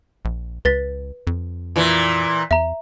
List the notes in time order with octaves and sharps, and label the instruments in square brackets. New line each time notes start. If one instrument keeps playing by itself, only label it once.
[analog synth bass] A#1
[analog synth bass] C#2 [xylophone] B4 A6 B6
[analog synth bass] F2
[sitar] A#2 E3
[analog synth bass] E2 [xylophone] E5 A#5